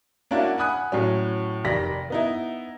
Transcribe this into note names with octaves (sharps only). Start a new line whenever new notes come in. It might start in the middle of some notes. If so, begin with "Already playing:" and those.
A#3 C#4 D4 E4 F#4
F#5 G#5 B5 D#6 F#6
A2 F#3 C#4
F1 D#3 G4 D5 A#6 B6
B3 D#4 E4